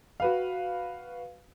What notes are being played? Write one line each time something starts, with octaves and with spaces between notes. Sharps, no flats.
F#4 B4 F5